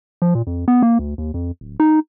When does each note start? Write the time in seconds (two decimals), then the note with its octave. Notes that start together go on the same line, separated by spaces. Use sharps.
0.22 F3
0.35 A#2
0.47 F2
0.68 B3
0.83 A#3
0.99 D2
1.18 D#2
1.34 F2
1.61 D1
1.80 D#4